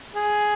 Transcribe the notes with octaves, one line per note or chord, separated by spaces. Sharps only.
G#4